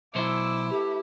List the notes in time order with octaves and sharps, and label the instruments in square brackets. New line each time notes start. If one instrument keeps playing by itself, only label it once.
[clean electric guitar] B2 F#3 C5 [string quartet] E4 [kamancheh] D6 E6
[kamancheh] A3 B4 [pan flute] G4